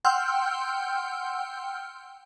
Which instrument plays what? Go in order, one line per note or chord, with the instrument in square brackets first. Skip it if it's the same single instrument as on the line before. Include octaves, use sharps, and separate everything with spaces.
[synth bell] F#5 G5 C6 E6 F6 G6